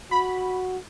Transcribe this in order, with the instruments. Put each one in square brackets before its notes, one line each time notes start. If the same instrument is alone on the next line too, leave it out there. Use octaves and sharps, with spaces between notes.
[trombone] F#4 [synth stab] B5